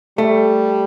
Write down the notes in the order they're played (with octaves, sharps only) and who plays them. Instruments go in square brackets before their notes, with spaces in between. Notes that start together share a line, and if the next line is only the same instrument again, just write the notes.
[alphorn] G3 [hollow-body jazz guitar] A3